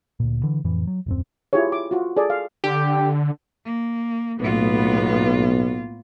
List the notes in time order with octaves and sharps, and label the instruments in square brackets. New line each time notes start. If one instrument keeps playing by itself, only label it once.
[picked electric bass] D2 A#2
D3 E3
F2 A2 E3
F#3
D#1 F#2 C4
[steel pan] E4 F4 G4 G#4 C#5
D6
F4 F#4
G#4 A4 D5
F5
[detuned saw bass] D3 [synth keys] G4
[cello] A#3
[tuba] B1 [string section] A2 B3 [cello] A#3 F4